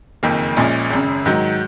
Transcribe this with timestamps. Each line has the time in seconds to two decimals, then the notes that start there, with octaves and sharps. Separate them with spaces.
0.23 F#1 F2 D#3 A#3
0.57 A#1 A#2 G#3 C#4 G#4
0.91 G#1 F#2 C#3
1.26 G#2 D#3 F#3